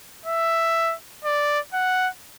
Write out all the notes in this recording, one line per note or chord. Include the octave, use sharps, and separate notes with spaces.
E5
D5
F#5